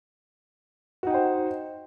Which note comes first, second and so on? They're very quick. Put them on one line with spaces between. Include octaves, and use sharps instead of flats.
F#4 D#4 G5 C5